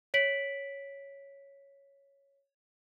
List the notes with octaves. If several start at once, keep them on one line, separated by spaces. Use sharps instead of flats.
C#5 B6 D7 F#7